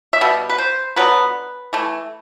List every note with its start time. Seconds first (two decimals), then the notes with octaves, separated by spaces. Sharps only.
0.13 E5
0.21 B2 G3
0.49 B4
0.58 C5
0.96 D3 F#3 B3 B4
1.73 E3 A3